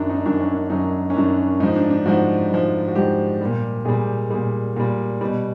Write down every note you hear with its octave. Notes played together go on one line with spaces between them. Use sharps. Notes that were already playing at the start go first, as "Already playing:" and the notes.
Already playing: F#2 D#3 F#3 D4
D#4
D4
F#2 D#3 F#3 D4
C#4
D4
F#2 D#3 F#3 D#4
C#4
F#2 D#3 F#3 D4
G#2 F3 D#4
D4
D4
G#2 F3 F#4
G#2 F3
F#4
G#2 F3 G4
A#2 G3
A#2 G3 G#4
A#2 G3 G#4
A#2 G3
B2 G3